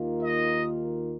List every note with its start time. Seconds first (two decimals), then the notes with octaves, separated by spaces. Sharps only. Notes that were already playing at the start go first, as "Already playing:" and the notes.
Already playing: D#2 D#3 A#3 F4
0.21 D#5